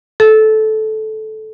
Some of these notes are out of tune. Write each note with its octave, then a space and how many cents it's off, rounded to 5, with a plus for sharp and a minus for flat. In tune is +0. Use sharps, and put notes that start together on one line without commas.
A4 -15